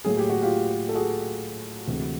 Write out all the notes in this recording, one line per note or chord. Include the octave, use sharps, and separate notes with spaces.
A2 F#3 A#3 G#4
G4
F#4
F4 G4
A4
F#4 G#4
D2 C3 E3 G#3